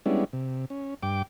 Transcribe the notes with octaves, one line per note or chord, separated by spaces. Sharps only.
G3 G#3 B3 C#4 D4 E4
C3
C#4
G2 G5 D6